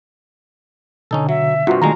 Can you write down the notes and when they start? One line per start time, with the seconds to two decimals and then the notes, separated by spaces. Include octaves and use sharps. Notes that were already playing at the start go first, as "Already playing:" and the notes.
1.11 B2 D3 C#4 D#4 A4
1.29 F#3 E5
1.67 G2 C3 F4 F#4
1.82 B1 D3 D#3 G#3 A3 A#5